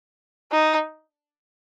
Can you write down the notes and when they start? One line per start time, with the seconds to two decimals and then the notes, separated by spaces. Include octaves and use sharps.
0.52 D#4